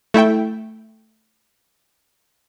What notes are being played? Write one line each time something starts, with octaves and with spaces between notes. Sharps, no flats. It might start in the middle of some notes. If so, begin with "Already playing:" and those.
A3 E4 E5 G5